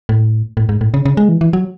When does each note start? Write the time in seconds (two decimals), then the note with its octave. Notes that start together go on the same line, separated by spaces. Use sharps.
0.09 A2
0.57 A2
0.69 G#2
0.81 A2
0.94 C#3
1.05 C#3
1.17 G#3
1.29 E3
1.41 E3
1.53 F#3